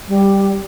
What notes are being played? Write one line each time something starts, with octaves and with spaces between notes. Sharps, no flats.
G3